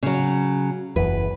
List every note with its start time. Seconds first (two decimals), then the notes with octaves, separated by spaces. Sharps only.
0.03 C#3 F#3
0.96 F#1 E2 B4